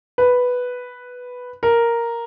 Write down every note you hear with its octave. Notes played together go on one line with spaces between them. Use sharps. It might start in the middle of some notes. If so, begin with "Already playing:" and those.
B4
A#4